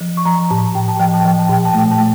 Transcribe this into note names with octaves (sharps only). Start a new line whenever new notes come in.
F3
C#6
F3 A#5
A2 A5
A2 G5
A5
F3 G5
A5
F3 G5
A5
A#2 G5
A5
A3 G5
A5
A3